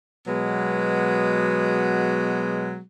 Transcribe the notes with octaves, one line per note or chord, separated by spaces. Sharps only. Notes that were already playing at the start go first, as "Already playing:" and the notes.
B2 F#3 G#3 B3